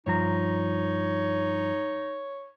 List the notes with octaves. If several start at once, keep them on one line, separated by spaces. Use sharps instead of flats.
G2 F3 D#4 C#5 A#5